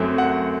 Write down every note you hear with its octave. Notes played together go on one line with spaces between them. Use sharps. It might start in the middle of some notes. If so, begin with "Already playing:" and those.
Already playing: F#2 F#3 A3 C4
F#5